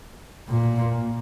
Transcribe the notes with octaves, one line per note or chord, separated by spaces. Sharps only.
A#2